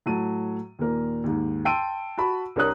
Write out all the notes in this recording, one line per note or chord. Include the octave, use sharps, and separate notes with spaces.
A2 F#3 A5 D#7
D#2 A#2 A#4
D#2 G#2
G5 A5 C6 E6 D7 D#7
F#4 A5 B5
C2 D4 A#4 C#5 D#6 F#6